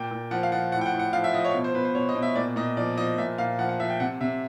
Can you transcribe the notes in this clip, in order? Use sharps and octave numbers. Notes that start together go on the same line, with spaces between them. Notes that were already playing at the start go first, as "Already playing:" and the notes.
Already playing: A#2 G5
A#2
F3 F#5
F5
F3 F#5
A2 F#5
G5
F#5
A2
F#5
F3 F5
E5
F3 D#5
C#5
B2
C5
B2 B4
C5
B2 C#5
D#5
B2
E5
A#2 D5
A#2 D#5
F3 D5
F3 D#5
A#2 E5
A#2 F5
F3 F#5
F#5
F3 E5
G5
C3 F#5
C3 E5